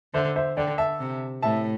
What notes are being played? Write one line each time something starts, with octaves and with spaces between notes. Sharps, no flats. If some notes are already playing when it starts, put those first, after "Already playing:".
D3 C5 E5
C5 E5
D3 D5 G5
E5 A5
C3
A2 E5 A5